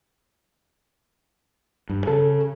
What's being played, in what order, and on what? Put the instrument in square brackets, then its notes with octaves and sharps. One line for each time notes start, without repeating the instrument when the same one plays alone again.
[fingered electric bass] G2
[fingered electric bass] C#3 [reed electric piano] A4